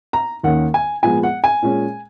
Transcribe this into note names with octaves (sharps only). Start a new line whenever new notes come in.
A#5
D#2 D#3 A#3 C#4 F#5
G#5
A#2 F3 G#3 B3 G#5
F#5
G#5
A#2 G#3 C#4